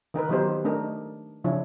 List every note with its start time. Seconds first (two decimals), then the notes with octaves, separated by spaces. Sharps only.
0.14 D#3 D#4 A#4 B4
0.29 D#3 F#3 B3 D#4 G4 C5
0.64 A3 D4 D#4 A#4
1.44 C#3 F3 D4 E4 C#5